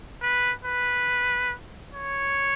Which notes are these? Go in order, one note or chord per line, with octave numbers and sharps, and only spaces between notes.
B4
B4
C#5